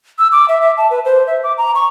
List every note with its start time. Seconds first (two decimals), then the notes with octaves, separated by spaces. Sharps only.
0.19 E6
0.32 D6
0.48 E5
0.61 E5
0.77 A5
0.90 B4
1.05 C5
1.27 E5
1.43 D6
1.58 A#5
1.75 C#6